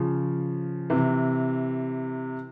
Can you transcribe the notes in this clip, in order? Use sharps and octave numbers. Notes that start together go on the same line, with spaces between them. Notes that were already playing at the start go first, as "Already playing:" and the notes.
Already playing: C#3 F3
C3 E3